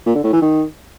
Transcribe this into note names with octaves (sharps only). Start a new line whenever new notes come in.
A#2
D3
A2
E3
D#3